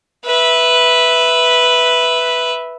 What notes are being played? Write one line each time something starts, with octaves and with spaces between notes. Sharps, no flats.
B4 E5